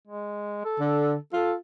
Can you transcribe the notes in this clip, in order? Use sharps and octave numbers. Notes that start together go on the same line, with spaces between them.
G#3
A4
D3
F4 A4